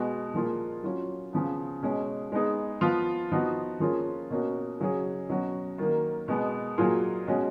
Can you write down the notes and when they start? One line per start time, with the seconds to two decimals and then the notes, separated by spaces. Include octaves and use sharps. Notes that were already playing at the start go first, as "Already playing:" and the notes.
Already playing: B2 G#3 B3 F#4
0.34 A#2 F3 A#3 F4 G#4
0.83 F#3 C#4 F4
1.33 C#3 F3 B3
1.82 B2 G#3 C#4
2.32 G#3 B3 D#4 G#4
2.81 F3 B3 F4
3.32 F3 B3 D#4 F#4
3.80 F3 A#3 C#4 F4 G#4
4.30 B2 A#3 C#4 F#4
4.80 C#3 F#3 C#4 G#4
5.29 B2 F#3 C#4 F#4
5.78 D#3 F#3 A#3
6.28 B2 G#3 B3
6.78 A#2 F#3 A#3 F4 G#4
7.27 B2 G#3 C#4 F#4